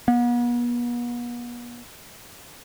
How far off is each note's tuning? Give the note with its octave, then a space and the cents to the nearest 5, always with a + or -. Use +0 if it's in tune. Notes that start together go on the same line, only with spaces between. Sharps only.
B3 -40